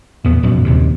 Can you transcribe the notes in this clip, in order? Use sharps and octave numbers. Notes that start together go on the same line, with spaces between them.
A#1 E2 B3
F1 A#1 F#2 B2
D#1 D#2 C3